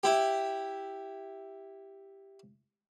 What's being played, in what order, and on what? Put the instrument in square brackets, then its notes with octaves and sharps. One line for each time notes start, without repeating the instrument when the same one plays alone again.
[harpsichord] E4 G4